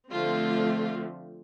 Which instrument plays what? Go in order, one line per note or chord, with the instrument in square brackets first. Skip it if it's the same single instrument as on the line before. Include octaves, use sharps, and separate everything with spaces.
[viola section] D3 F3 A3 C4 F4